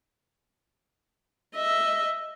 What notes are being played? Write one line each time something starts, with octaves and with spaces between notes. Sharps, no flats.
D#5 E5